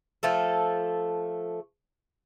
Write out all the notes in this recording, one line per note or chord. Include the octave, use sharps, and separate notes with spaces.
F3 A3 A4